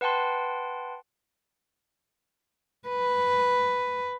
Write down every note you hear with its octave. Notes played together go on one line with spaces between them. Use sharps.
B4 F#5 G5 A5 C6
B4